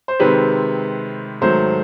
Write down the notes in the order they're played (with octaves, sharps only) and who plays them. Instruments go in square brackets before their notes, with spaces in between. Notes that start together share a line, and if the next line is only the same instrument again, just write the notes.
[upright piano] C5
C3 D#3 G#3 C4 B4
G#2 D#3 F#3 A3 C5